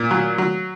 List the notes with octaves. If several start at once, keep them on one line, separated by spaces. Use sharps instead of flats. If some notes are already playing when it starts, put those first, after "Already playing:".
Already playing: A#2
F#3
F#3